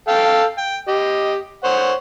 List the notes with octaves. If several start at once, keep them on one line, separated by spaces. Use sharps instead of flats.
A4 F5 G5
G5
G4 D#5
C5 C#5 F#5